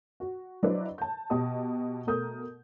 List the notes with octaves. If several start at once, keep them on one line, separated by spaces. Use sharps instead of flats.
F#4
F#3 D4 E4 B4 C5 D#5
A5 G6
B2 G4 D#5 A5 D#6
B2 A3 A#4 D#6 G6